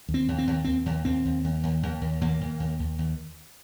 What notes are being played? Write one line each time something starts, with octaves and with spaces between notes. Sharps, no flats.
D#2
C4
D#2
C4
D#2
D#2 C4
D#2
D#2 C4
D#2
D#2
D#2
D#2
D#2
D#2 A#3
D#2
D#2
D#2
D#2